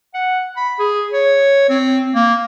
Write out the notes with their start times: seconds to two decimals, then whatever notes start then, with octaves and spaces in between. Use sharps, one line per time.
0.14 F#5
0.57 B5
0.79 G#4
1.12 C#5
1.69 C4
2.15 A#3